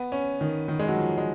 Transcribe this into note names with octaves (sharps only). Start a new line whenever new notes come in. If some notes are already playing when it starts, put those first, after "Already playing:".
Already playing: B3
C#4
D#3
D#3
G#3
F#3
F3
G#3